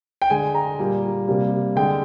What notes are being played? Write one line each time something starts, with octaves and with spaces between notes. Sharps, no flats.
G5
D3 G#3 G#5
A#5
A#2 G3 A#3
C3 G3 A#3
D3 G#3 G5